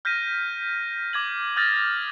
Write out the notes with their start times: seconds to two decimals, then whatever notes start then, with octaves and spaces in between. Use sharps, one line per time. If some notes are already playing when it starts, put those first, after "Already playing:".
0.05 F6 G6 A#6 B6 D#7
1.13 D6 G#6 F#7
1.56 D#6 F6 G6 A6 A#6